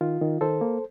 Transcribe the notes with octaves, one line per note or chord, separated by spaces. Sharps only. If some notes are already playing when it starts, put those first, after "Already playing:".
D#3 F4
D#3
D#3 A4 C5
A#3